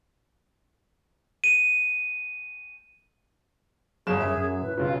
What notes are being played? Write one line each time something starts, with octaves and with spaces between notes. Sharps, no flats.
D#7
G1 F#3 G#4 E7
F#2 E5
F#2
A2 B4
B1 C#3 F4